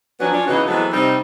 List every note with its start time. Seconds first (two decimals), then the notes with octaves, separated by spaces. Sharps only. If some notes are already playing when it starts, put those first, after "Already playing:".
0.20 F3 F#3 B3 C#4 D4 F#4
0.33 C#4 D4 F4
0.48 C#3 E3 B3 D#4 F#4
0.67 E3 F#3 G#3 B3 C4 A4
0.92 C3 G3 C4 D#4